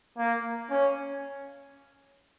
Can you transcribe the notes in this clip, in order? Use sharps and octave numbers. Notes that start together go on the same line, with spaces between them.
A#3
C#4